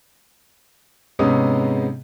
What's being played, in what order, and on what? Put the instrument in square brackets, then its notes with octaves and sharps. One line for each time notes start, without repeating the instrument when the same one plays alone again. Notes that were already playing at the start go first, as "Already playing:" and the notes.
[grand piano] G#2 C3 G#3 B3 C#4 D#6